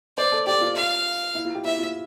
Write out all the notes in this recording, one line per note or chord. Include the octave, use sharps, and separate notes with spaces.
C5 D5
A4
G4 D5
F4
F5
E4
F4
G4
E4 E5
F4